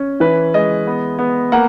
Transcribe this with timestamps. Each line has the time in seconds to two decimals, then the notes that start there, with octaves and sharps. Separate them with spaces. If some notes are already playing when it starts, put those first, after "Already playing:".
Already playing: C#4
0.20 E3 B4
0.54 G#3 D#5
0.87 B3
1.19 B3
1.52 A#3 F#5